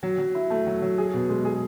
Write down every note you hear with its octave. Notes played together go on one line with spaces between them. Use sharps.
F#3
F#3
E4
A3
F#3
F#3
G#4
B2
G#3
G#4